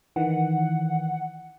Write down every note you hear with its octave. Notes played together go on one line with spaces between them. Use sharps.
D#3 E3 F#5